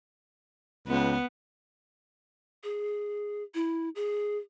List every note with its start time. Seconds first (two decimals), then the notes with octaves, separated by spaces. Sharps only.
0.88 C#2 B3
2.63 G#4
3.54 E4
3.95 G#4